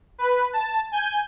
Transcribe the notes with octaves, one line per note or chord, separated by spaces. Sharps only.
B4
A5
G#5 G6